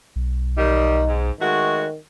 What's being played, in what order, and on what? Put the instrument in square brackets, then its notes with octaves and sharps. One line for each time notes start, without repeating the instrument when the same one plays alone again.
[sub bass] B1
[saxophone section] D#3 G3 [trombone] D#4
[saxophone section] G#2
[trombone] D#3 [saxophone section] G#3 A3 F#4